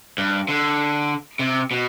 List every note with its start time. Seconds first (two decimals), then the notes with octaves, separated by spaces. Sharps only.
0.18 G2
0.48 D3
1.39 C3
1.71 B2